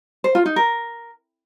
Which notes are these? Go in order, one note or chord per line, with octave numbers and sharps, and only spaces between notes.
C5
F4
D#4
A#4